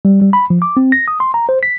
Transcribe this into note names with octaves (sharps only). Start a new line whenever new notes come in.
G3
G3
B5
F3
D6
C4
A#6
D#6
C6
A#5
C5
B6